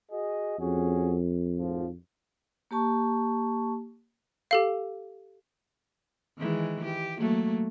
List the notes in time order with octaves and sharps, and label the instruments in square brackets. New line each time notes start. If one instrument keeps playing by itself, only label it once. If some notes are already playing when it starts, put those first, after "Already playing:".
[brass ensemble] F#4 G#4 D#5
[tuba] F2 [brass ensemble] C#4 F#4 G#4
[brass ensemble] G#1 A2 F3
[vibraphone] A#3 G4 A5 C#6
[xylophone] G4 A4 F5
[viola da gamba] D#3 E3 G#3
G4
F#3 A3 A#3